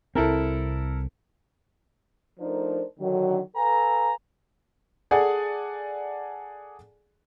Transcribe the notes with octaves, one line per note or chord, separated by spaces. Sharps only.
C2 C4 E4 A4 A#4
F3 A3 D4 D#4 A#4 C5
D3 D#3 F#3
A4 B4 F5 G#5 A#5
G#4 A4 D5 F#5 G#5